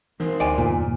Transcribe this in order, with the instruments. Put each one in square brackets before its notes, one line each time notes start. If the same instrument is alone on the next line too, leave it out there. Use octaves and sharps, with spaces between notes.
[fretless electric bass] E3 [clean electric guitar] D#4 A#4 C5
[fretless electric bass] D2 [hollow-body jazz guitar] D5 G#5
[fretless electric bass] E2 G2 D3 [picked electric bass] A#2